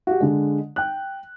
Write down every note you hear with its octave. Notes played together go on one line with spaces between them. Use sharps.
F#4 G4
D3 G#3
G5 F#6